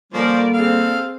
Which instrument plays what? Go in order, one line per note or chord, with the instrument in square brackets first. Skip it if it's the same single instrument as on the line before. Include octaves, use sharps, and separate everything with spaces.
[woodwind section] D3 G3 A#3 [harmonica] F3 C#4 C5 [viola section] A#4 D5
[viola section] C4 G#4 [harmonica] A4 F5